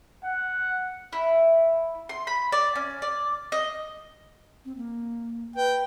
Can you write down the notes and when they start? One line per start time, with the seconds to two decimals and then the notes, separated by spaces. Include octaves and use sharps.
0.25 F#5
1.13 E4
2.09 C6
2.27 B5
2.52 D5
2.75 C#4
3.02 D5
3.52 D#5
4.65 C4
4.77 A#3
5.56 B4 G5